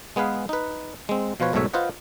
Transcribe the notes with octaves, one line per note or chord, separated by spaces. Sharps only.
G#3 B3 G#4 B4 F5
D#4 B4
G#3 C4
B2 F3 F4 B4 C#5
B1 G#2 B2 A3 C#5 E5
F4 B4 C5 D#5 F#5